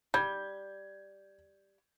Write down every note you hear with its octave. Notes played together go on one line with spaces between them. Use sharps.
G3 G6 G#6